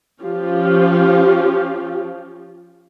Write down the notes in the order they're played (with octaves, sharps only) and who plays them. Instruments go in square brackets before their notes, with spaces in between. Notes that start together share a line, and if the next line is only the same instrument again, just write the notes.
[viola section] F3 C#4 F4 G4